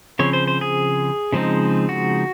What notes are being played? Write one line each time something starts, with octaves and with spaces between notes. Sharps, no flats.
C#3 F3 C4 C#5
C5
C5
G#4
C#3 F3 G#3 C4 D#4
F#4